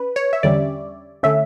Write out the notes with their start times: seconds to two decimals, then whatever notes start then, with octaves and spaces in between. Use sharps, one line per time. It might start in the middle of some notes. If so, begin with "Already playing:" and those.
Already playing: C#4 B4
0.16 C#5
0.33 E5
0.43 E2 D3 G3 C#4 D5
1.23 D3 A3 C#4 E5